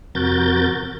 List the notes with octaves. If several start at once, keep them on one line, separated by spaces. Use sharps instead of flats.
F2 C3 F#4 A#4 G6 A6